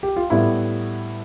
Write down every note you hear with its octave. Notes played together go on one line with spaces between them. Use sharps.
G4
F4
A2 G3 B3 E4